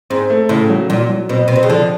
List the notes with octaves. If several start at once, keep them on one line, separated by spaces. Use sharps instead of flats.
G#2 C4
A3
A2 C#3
F#3
A#2 F#3
F#3
B2 C4
B2 C4
C3
C#3
D3 F3